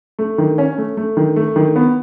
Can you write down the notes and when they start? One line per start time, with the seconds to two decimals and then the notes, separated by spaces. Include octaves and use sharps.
0.19 A3
0.38 D#3
0.58 C#4
0.78 A3
0.97 A3
1.17 D#3
1.36 A3
1.56 D#3
1.76 B3